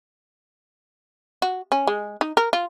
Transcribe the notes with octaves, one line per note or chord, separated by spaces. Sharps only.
F#4
C#4
G#3
D#4
A#4
F4